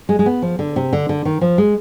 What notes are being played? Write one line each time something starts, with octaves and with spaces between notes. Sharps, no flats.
G#3
G#3
B3
F3
D3
C3
D3
D3
D#3
F3
G#3